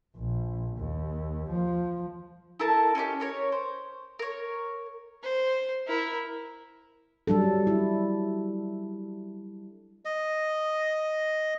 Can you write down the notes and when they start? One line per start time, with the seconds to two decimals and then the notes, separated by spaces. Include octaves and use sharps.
0.17 A#1
0.77 D#2
1.50 F3
2.60 E4 A4 A#4 A5
2.95 C#4 D#4 F4 G4
3.20 C#4 A#4 C#5
3.52 C5
4.19 A#4 C#5
5.23 C5
5.87 E4 A#4
7.27 F#3 G3 D4 A4
7.67 E4
10.05 D#5